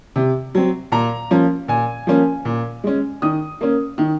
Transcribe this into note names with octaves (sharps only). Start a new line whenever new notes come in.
C3
F#3 C4
A#2 A#5
F3 A#3 C#4
A#2 G#5
F3 A#3 C#4
A#2
G#3 C#4
D#3 D#6
A#3 C#4
D#3